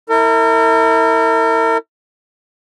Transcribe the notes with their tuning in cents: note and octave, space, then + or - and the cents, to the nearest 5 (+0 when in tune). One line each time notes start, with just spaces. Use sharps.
E4 -25 A#4 -40